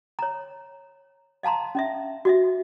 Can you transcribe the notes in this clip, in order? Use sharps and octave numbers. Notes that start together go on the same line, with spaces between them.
C#5 A#5
D#5 F5 A5 A#5 C6
C#4 D#5 E5
F#4 D#5 E5